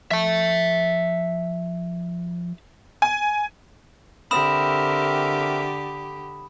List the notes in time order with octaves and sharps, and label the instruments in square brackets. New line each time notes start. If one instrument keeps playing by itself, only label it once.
[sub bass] F3 [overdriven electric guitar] E5 A5
[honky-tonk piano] G#5
[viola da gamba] D3 G4 [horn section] C4 A#4 E5 [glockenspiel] B5 D#6 E7